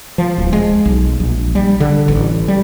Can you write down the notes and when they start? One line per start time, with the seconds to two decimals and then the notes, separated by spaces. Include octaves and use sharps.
0.18 F3
0.38 D1
0.53 G#3
0.85 B1
1.20 A#1
1.55 G3
1.80 D3
2.08 A1
2.48 G3